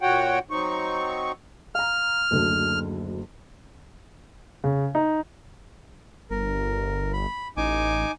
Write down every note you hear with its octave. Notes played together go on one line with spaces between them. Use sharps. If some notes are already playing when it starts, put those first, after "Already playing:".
A#2 F#4 C#5 F#5 G5
F#3 C4 D#4 C#6
F5 A#5 F6
F#1 D2 D3
C#3
D#4
G1 A#4
B5
A1 D#4 G#5 D6